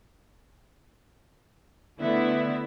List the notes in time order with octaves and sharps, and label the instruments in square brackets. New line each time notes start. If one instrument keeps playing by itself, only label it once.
[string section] D3 A3 B3 E4 E5